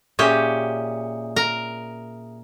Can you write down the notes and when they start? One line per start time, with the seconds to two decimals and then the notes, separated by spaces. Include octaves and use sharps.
0.19 A#2 C#4 G4 G#4 E5 D#6
1.36 A#4